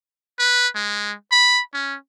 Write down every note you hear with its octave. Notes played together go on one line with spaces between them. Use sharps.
B4
G#3
B5
C#4